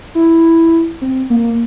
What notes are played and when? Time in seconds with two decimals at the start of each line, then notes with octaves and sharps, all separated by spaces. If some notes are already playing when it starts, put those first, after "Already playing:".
0.15 E4
1.01 C4
1.30 A#3